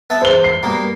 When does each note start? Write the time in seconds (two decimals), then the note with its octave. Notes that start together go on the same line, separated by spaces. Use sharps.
0.10 B3 E5 A5
0.22 E2 C5 G7
0.44 C7
0.63 G2 B2 A#3